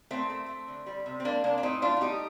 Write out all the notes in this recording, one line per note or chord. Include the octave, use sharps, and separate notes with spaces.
A#2 A3 C4
A3
A3
D3
G3
C3
C4
G3 A#3 D4
C3 A#3 D4
D4
A2 C4 D#4
A3 D4 F4
F4
G3 D#4 G4